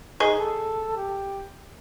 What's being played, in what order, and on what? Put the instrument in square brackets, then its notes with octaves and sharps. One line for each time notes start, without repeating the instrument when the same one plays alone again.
[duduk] D#4 [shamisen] G#4 D#5
[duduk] A4
G4